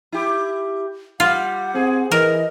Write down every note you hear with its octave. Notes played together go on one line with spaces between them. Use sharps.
E4 G4
G3 F4 F#5
C4 G#4
E3 A#4 D#5